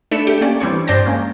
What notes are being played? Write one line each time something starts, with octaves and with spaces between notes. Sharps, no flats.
A3 D4 B5 C#7 E7
A3 G4
A#3 C#4 G4 D5
E3 G3 C4 D4 C#5
G2 C5 D5 G5 A5 A#6
G#3 A#3 C#4